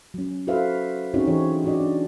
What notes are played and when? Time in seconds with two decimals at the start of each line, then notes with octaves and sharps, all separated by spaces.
0.14 F#3 C#4
0.47 F#4 A4 B4 C5 E5 F5
1.14 C4 C#4 D#4 F#4 G#4 C#5
1.27 E3 G#4 C#5
1.64 D4 D#4 F#4 D5 D#5
1.81 D4